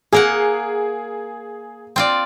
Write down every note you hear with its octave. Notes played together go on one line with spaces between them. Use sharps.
A#3 G#4 A#4 F#5
C4 F4 D5